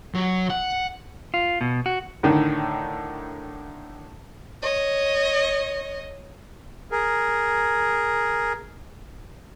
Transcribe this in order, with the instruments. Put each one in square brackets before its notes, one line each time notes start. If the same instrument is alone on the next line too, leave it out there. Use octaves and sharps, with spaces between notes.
[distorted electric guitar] F#3
F#5
[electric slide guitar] F4
B2
F#4
[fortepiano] A2 D3 D#3
[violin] C#5 D#5
[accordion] G#4 A#4